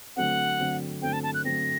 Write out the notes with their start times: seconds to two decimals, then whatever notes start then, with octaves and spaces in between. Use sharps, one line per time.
0.16 D3 F#3 A3 C4 F#5
0.59 D3 F#3 A3 C4
1.02 D3 F#3 A3 C4 G5
1.13 A5
1.23 A5
1.34 F#6
1.44 D3 F#3 A3 C4 A#6